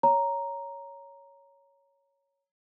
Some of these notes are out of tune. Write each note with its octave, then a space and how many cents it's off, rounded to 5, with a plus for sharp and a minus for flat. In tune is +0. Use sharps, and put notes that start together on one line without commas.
C#5 +5 A#5 +0